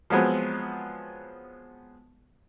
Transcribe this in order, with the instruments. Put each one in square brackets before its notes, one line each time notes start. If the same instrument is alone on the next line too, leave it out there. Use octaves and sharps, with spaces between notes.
[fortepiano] F3 F#3 G#3 B3 C4